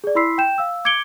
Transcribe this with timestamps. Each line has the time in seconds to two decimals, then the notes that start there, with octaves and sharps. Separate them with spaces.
0.04 G#4 D5
0.15 E4 B5 C6 E6 B6 C7
0.38 G5 G6 E7
0.58 F5 E6
0.85 D6 G#6 C#7 D7 G7